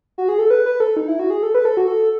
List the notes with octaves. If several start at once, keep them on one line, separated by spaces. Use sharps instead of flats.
F#4
G#4
A4
B4
B4
A4
D#4
E4
F#4
G#4
A4
B4
A4
F#4
A4